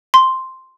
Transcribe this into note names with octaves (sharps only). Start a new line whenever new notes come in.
C6